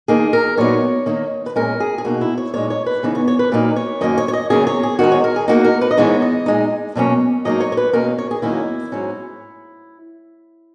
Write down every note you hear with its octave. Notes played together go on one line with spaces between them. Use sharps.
D#3 A#3 D#4 G#4
A#4
A#2 F#3 B3 D#4 C#5
D#3 A#3 D#4
B4
A#2 G#3 C#4 A#4
G#4
G#4
B2 A#3 D#4 F#4
E4
C#5
A#2 G#3 D#4 C#5
C#5
B4
C#3 E3 B3 D#4
C#5
C#5
B4
A#2 F#3 A#3 D#4 B4
C#5
F#2 D#3 A#3 C#4 D#5
C#5
C#5
D#5
E2 C#3 F#3 A#3 C#4 G#4
C#5
G#4
D#3 G#3 D#4 F#4
C#5
A#4
G#4
E2 B2 A#3 D#4 F#4
A#4
B4
D#5
G#2 E3 G#3 B3 D#4 C#5
D#5
A#2 G#3 D#4
B2 F#3 A#3 C#4
G#2 F#3 A#3 D#4 D#5
C#5
C#5
B4
E2 B2 A#3 C#4 A#4
C#5
G#4
E2 D#3 F#3 A#3 C#4 E4
G#2 F#3 C#4